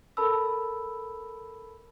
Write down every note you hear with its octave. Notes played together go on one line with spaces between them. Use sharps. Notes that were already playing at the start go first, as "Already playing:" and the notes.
A4 A#4 A5 B5 E6